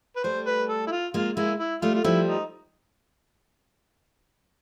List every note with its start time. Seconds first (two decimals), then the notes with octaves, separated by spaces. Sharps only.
0.16 B4
0.24 G3 A3 C5
0.47 B4
0.70 A4
0.87 E4
0.91 F4
1.14 G#3 A#3 F4
1.36 G#3 A#3 E4
1.60 E4
1.82 G3 A3 F4
1.95 F4
2.04 F3 G3 E4
2.27 D#4